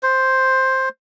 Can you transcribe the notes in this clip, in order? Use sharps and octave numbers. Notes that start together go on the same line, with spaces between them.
C5